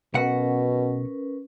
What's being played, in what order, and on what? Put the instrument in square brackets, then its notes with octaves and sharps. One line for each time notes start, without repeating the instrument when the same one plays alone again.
[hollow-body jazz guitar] B1 F#5 [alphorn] B2 [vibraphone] C#4 A#4 B4